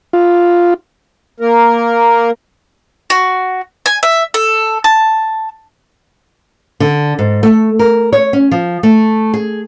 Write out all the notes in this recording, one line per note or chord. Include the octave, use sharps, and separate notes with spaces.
F4
A#3 A#4
F#4
G#5
E5
A4
A5
D3
G#2
A3
A#4
C#5
C#4
F3
A3
G#4